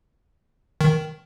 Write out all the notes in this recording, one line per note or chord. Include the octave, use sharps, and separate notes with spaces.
D#3